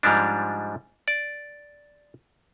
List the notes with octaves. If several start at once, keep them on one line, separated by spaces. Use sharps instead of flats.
G#2 F3 G3 G#3 D4
D5